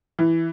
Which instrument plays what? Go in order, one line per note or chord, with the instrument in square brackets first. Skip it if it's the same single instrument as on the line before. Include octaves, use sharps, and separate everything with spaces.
[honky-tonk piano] E3